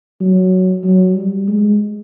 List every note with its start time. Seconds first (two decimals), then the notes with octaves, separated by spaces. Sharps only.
0.21 F#3
0.84 F#3
1.15 G3
1.48 G#3